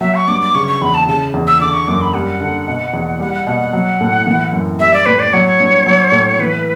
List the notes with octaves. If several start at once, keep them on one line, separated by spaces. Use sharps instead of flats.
F#3 E5
C#6
G2 D6
D6
C#3 C#6
C#6
E2 B5
A5
C#3 A5
E2
E6
D3 D6
C#6
F#2 D6
B5
G3 F#5
D3
B2
E2
G3 F#5
F#5
B2 F#5
F#5
F#3
A2
E3
F#2
G3 E5
D5
A2 B4
D5
F#3 C#5
G2
F#3
A2
E3 B4